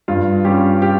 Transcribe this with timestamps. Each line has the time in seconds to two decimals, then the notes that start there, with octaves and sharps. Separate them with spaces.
0.08 G2 F4
0.45 G3 C#4 F4 G4
0.82 G4